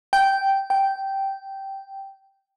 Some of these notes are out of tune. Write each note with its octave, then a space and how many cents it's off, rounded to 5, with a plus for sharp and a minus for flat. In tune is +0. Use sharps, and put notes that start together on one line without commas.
G5 -10
G5 -10